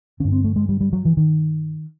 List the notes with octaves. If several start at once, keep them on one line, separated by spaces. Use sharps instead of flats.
G2 D3 C#4
C4
A3
G#3
G3
G3
F#3
E3
D#3